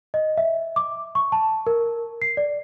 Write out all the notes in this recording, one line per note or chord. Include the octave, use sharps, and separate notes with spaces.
D#5
E5
D6
C#6
A5
A#4
C7
D5